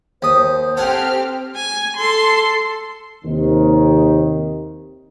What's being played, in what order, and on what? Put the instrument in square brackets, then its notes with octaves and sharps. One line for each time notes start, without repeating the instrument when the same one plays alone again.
[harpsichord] D#2 D#6 [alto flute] C5
[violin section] C4 G4 F6 [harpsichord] A4 F#5 G#5
[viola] G#5
A4 C6
[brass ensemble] D#2 C3 D#3